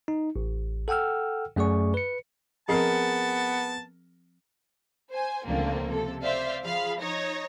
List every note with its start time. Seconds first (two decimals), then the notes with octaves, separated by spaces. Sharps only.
0.08 D#4
0.36 A1
0.88 A4 F#5 G5 E6 F6
1.56 F#2 A3 G#4 D5 C#6
1.94 B4 C#7
2.69 F3 B3 C4 G#4 A#4 A5
5.10 C5 G#5
5.45 C#2 D3 F3 A3 A#3 C4
5.88 C3 A4
6.23 C5 D5 E5 F5
6.64 F3 G#4 F5 B5
6.99 D#4 C#5 A#6